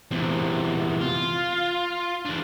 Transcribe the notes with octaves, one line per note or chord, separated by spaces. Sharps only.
E2 C3
F4
E2 D4